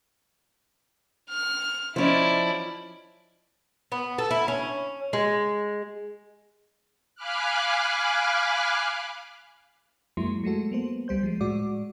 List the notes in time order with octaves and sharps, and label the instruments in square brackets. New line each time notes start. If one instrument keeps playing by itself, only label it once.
[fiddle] F6
[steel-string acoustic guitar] F3 C#4 D#4 [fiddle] E4 D5
[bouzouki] B3
A4
E4
C#4
G#3
[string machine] F5 G#5 B5 D6 F6 F#6
[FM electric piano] F#2 F#3 G#3 A#3 E4 C6
F#3 G#3 A3 F#4 A4
A#3 B3 C5
C#2 G3 C5 G6
F3 G#3
A2 G#3 F#4 D5 D6